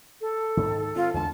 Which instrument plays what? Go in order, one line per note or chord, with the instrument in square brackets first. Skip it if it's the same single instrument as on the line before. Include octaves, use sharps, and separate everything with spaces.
[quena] A4
[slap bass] G#2 D#3
[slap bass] C4 [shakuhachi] F4
[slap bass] E2 D3 G#3 [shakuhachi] A5